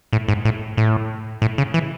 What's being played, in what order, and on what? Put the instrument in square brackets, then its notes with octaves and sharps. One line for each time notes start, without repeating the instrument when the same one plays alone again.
[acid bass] A2
G#2
A2
A2
A2
C#3
E3